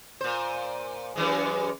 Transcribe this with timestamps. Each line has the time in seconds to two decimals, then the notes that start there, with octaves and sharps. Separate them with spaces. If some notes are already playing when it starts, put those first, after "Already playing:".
0.21 A#2 C5
1.16 F#2 E3 G#3